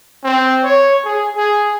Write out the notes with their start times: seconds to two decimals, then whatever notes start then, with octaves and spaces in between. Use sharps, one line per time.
0.24 C4
0.64 C#5
1.05 G#4
1.36 G#4